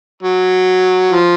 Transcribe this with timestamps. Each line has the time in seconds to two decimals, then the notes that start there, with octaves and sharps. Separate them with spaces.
0.23 F#3
1.11 F3